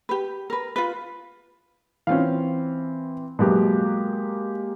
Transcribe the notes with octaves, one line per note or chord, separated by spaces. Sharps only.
G4 B4
A#4 B4
F4 B4
E3 C4 C#4 F4 F5
F#2 B2 G#3 A#3 G4